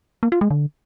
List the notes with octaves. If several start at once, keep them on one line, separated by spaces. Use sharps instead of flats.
A#3
F4
G#3
D3